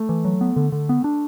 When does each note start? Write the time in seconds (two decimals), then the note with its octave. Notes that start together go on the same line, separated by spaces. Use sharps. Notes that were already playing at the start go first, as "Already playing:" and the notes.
Already playing: A3
0.09 E3
0.25 F#3
0.41 B3
0.56 D3
0.72 D3
0.89 B3
1.04 D4